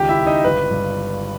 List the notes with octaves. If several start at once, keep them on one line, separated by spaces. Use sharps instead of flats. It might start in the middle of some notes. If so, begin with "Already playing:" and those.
Already playing: C#2 D#3 G4 G5
E4 E5
C#2
D#4 D#5
G1 B4
G2